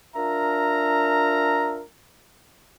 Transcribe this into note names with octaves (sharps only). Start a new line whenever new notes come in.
D4 F4 A#4 E5 A#5